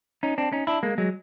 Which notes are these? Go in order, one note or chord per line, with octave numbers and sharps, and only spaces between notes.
C#4 D#4
C4 D4
C#4 D#4
D4 E4
G#3 A#3
F#3 G#3